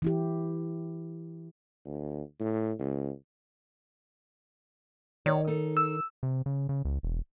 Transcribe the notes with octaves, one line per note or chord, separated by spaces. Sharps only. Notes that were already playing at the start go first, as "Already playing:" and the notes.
E3 E4 G4
D2
A2
C#2
D#3 C#5 D5
D#4 A4
E6
C3
C#3
C#3
C#2
E1